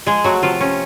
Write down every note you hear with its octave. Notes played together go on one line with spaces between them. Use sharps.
F3 G#3 G#4
F#3 A3 F#4
C3 F3 F4
C3 C#4